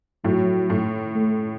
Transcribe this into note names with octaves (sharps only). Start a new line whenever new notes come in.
A2 F#3
A2
A3